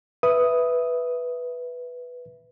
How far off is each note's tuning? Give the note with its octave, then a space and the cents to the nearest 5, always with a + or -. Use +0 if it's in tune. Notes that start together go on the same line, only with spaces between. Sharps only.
B4 +0 E5 +0 D#6 +0